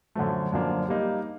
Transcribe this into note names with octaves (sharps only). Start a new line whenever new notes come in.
F#2 D3 F3 A3
F#2 D3 F3 A#3 D4
G3 A#3 D#4